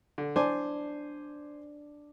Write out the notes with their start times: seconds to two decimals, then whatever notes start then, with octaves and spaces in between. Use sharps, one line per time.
0.18 D3
0.36 D4 C5 G#5